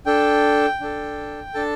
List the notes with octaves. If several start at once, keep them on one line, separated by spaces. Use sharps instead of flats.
D4 A4 G5
D4 A4
D4 A4 A5